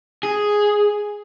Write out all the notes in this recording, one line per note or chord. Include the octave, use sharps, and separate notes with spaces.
G#4